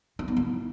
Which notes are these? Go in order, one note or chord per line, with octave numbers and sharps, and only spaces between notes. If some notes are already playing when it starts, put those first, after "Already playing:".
D#4
B3
E4